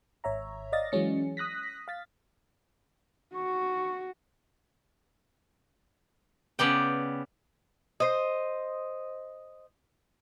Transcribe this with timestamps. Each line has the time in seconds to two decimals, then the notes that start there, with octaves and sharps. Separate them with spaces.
0.24 G#1 C#5 E5 A#5
0.72 D5 D#5 F5 A6 A#6
0.92 E3 F#3 G#3 C#4 C#7
1.37 D#6 F#6 A#6 B6
1.88 F5 A6 B6
3.35 F#4 C#6
6.59 C#3 B3 D5 G5
8.00 C5 D#5